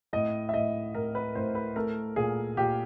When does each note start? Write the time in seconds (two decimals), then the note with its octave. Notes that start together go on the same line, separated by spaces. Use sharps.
0.13 A2 D#5
0.49 E5
0.54 A2 D#5
0.95 A2 A#4
1.15 B4
1.35 A2 C5
1.55 B4
1.76 A3 A#4
2.16 A#2 G#4
2.57 A#2 G4